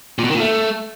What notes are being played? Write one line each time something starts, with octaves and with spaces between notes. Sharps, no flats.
A#2
B2
D#3
A#2
A3